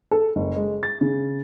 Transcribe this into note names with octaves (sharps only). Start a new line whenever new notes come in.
A4
F#1
G#3
A6
C#3